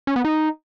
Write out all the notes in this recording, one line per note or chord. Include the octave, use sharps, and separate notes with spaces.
C#4
B3
D#4